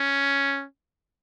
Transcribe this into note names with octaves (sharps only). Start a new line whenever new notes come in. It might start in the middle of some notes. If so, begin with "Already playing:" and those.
Already playing: C#4